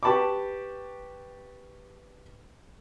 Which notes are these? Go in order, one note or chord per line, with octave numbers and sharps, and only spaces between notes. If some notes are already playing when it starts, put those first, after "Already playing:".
G4 B4 A5 B5 C#6 D6